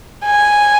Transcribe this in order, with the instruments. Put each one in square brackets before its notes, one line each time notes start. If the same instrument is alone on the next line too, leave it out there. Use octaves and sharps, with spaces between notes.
[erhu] G#5